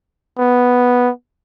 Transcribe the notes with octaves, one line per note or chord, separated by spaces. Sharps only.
B3